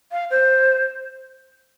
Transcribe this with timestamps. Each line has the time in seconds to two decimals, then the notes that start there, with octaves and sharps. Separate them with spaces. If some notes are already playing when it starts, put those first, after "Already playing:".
0.12 F5
0.31 C5